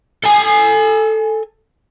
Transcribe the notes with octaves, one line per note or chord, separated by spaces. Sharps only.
A4 G#5